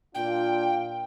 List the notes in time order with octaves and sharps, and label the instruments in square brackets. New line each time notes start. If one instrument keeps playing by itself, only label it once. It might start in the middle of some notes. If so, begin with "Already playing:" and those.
[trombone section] A#2 D4 F4 [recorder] G5